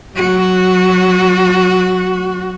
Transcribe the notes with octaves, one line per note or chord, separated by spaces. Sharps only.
F#3 F#4